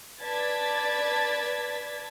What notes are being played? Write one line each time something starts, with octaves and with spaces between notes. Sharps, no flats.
B4 D5 A5 G#6 A6 B6